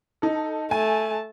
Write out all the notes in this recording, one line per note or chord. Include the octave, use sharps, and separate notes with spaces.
D#4 A4
A3 G#5 A5